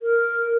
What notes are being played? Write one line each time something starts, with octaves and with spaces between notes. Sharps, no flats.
A#4